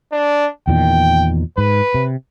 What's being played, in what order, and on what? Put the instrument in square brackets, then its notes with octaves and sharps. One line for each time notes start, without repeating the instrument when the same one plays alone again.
[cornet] D4
[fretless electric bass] E2 A#2 D#3 [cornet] G5
[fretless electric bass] G#2 [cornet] B4
[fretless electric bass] C3